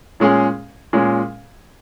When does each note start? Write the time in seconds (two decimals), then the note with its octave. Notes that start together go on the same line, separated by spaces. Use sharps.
0.20 A#2 G#3 C#4 G#4
0.93 A#2 G#3 C#4 G#4